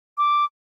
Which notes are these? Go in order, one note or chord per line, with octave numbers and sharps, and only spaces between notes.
D6